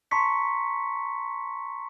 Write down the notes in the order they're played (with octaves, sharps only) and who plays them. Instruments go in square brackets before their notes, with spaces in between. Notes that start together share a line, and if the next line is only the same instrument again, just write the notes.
[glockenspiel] A5 A#5 C6 C#6 B6 C#7